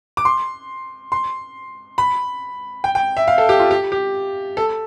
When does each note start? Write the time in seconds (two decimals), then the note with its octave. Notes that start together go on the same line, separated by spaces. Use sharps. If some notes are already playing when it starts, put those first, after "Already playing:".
0.17 D6
0.25 C6
1.12 C6
1.98 B5
2.84 G5
2.95 G5
3.17 E5
3.28 F5
3.38 A4
3.49 G4
3.59 F4
3.71 G4
3.92 G4
4.57 A4